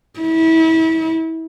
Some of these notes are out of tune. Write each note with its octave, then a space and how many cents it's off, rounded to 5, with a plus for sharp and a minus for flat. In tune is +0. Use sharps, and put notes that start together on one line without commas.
E4 -30